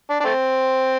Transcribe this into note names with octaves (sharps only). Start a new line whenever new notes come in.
D4
D4
A3 C4